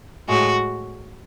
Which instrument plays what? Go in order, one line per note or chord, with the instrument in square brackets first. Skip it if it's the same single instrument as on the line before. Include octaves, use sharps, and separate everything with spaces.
[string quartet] A2 G#3 F#4